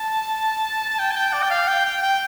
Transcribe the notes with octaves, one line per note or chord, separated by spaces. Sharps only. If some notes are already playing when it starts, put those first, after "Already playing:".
Already playing: A5
A5
G5
A5
G5
D5
G5
F5
G5
G5
G5